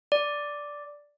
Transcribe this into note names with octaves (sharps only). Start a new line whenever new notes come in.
D5